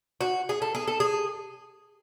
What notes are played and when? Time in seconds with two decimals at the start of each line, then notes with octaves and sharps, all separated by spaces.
0.21 F#4
0.49 G#4
0.62 A4
0.75 G#4
0.87 A4
1.00 G#4